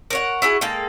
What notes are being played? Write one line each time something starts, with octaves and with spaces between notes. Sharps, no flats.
A#4 C#5 F#5
E4 F#4 G#4
G#3 A#3 A4 G5